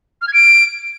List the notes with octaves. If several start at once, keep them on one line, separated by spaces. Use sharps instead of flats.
F6
G#6
D7